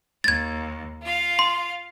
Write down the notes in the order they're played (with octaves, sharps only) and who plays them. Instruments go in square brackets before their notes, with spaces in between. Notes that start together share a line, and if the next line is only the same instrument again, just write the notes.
[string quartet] D#2 [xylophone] G#6 A6
[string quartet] F4 F5
[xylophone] C6